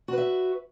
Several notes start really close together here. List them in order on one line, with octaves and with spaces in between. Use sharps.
F#4 B4 E5